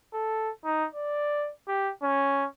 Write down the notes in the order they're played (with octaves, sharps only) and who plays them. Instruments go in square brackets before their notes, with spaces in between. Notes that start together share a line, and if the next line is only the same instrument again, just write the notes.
[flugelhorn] A4
D#4
D5
G4
C#4